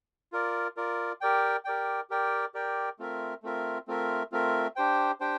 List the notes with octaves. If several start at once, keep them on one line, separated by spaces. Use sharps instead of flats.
F4 A#4 D5
F4 A#4 D5
G4 A#4 D5 G5
G4 A#4 D5 G5
G4 A#4 D5 G5
G4 A#4 D5 G5
A3 C4 F4 A#4 E5
A3 C4 F4 A#4 E5
A3 C4 F4 A#4 E5
A3 C4 F4 A#4 E5
D4 G4 C5 G5
D4 G4 C5 G5